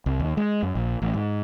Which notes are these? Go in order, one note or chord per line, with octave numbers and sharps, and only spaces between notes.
C2
D#2
G#3
F#2
A#1
A1
G#2